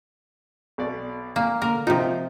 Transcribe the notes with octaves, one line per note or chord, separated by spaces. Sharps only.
B1 B2 D5
A#2 A#3
D3 A#3 A#4
C3 F3 D#4 F4